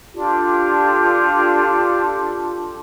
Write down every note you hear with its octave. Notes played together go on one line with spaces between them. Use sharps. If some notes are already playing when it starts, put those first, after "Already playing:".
D4 F4 G4 A4